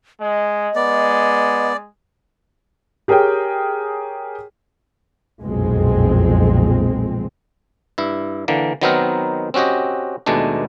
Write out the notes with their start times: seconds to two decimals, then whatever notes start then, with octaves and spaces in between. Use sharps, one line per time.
0.21 G#3 D#5
0.75 G#3 B3 D5
3.08 G4 G#4 A#4 C#5 G5
5.42 F#1 B1 F2 A#2 G#3 C4
7.98 G2 E4
8.48 D3 E3 A#3
8.81 D#3 F#3 B3 C4 D#4 A#4
9.54 C4 C#4 F#4 G4 D#5
10.26 D#2 B2 G#3 A3 D4